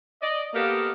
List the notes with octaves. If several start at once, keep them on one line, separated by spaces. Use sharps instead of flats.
D5 D#5
A#3 B3 G4 A4 D#5 F5